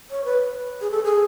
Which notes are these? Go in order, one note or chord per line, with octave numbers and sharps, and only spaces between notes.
C#5
B4
G#4
A4
G#4